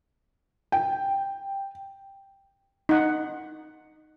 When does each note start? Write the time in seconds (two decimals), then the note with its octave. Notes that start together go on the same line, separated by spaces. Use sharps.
0.72 G5
2.89 D#4 F#5